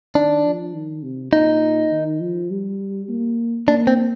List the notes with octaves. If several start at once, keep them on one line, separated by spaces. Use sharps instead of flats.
D#3 D4
F3
D#3
C3
A#2 D#4
D#3
F3
G3
A#3
A#3 D4
C4